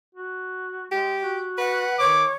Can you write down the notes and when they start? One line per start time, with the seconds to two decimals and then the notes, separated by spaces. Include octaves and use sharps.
0.15 F#4
0.92 G#3 G4
1.22 F#4
1.58 B4 F#5
1.99 D#3 C#5 D6